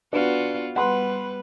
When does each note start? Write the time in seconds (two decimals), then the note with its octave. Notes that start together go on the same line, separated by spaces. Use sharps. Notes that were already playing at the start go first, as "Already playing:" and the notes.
0.13 B3 D4 F4 F#4 B4
0.76 G3 B3 B4 F#5 C6